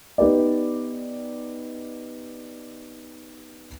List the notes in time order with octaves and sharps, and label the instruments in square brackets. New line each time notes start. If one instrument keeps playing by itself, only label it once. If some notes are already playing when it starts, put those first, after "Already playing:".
[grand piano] B3 D#4 G4 B4 D5